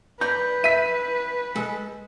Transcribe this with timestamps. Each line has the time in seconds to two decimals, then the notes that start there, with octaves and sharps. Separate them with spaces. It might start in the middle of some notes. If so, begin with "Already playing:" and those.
0.21 B4 D5 A#5 G6
0.64 E5 B6 D#7
1.56 G#3 A4